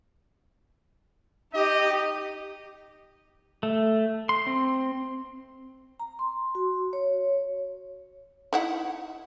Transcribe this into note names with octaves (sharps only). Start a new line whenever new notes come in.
D#4 G4 D#5
A3
C6
C4
A#5
C6
F#4
C#5
D#4 E4 F#5